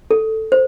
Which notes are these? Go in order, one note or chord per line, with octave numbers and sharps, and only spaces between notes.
A4
C5